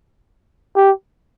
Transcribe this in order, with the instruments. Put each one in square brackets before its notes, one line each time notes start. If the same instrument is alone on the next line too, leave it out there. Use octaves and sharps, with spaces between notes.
[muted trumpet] G4